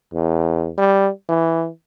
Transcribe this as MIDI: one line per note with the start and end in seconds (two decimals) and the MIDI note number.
0.14 0.70 40
0.78 1.10 55
1.29 1.69 52